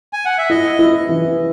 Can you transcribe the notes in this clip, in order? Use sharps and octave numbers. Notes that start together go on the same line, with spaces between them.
G#5
F#5
E5
E4 D#5
E4
E3